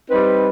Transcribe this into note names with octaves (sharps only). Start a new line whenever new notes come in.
G3 C4 D#4 B4